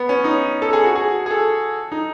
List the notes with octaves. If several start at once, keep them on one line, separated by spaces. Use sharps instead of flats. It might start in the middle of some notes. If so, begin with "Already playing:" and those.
Already playing: B3
C#4
D#4
A4
G#4
F#4
G#4
G#4
A4
D#4